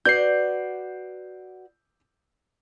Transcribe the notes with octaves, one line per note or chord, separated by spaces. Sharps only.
F#4 B4 D5 G6 C7